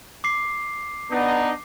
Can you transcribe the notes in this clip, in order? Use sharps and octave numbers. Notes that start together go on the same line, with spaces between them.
D6 C7
B3 D4 D#4